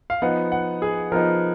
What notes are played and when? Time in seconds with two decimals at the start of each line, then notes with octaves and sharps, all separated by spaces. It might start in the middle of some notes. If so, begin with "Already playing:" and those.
0.10 F5
0.22 F3 B3 D#4 F#5
0.52 F#5
0.82 G#4
1.12 F3 B3 D#4 A#4